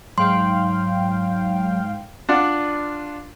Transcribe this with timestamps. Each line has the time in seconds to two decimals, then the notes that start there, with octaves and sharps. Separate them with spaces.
0.18 G#2 F#3 F5 G5 C6
2.29 D4 F4 D5 F#5